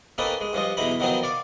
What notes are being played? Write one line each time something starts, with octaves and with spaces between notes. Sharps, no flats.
A#3 C4 C#4 D#4 A4 B4
G#3
G2 F3 F4 D#5
B1 E2 E3 D#4 A#5 B5
D#3 F3 F#3 B3 C4 D#4
D5 F5 C#6 D6